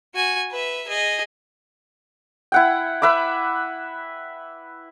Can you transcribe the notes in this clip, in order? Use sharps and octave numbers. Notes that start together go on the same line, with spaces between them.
F#4 G#5
B4 E5
G#4 D#5
E4 F#5 G5
B4 E5 B5 D6